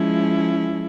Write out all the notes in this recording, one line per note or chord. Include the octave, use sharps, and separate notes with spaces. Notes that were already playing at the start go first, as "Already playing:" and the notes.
Already playing: F3 G#3 C#4 E4